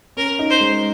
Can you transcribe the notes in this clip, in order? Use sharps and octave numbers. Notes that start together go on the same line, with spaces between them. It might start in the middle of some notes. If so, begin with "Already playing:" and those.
C#4 A#4
D#4
C5
G#3